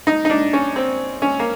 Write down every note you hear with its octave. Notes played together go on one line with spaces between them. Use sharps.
D#4
D#4
D4
C#4
C4
C#4
A#3